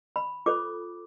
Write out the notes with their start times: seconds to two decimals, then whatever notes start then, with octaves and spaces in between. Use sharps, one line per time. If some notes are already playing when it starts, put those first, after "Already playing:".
0.16 B5
0.46 F4 A4 C5 D6